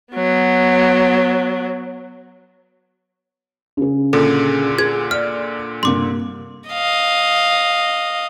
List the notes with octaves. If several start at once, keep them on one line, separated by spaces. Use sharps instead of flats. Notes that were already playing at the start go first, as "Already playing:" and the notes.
F#3 B3
C#3 G#4
A#2 D3 A4
G#4 G#6
D5 F6
G2 C3 A#3 C6 D6
D#5 F5